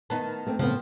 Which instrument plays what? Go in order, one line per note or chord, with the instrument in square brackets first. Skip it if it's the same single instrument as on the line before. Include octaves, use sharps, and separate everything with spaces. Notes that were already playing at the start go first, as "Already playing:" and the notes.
[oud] D#3 B3 D#4 [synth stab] A5
[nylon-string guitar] A3 A#3 C4
[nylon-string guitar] A2 C4 [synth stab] C#3 B3 [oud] F3